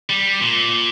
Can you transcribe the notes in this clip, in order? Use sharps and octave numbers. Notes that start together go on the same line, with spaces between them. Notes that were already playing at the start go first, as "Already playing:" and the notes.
G3
A#2